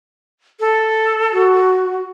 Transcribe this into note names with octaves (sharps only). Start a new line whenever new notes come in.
A4
F#4